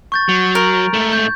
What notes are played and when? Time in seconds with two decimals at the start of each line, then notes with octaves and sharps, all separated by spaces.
0.12 C#6 G6 A6
0.29 F#3
0.55 A#4
0.94 G#2 A3
1.13 G6